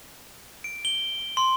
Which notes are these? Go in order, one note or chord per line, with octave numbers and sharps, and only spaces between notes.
D7
G7
C6